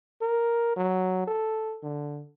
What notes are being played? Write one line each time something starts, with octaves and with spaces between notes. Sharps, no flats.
A#4
F#3
A4
D3